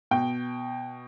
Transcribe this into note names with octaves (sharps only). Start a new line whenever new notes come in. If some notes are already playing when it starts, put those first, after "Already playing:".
B2 G5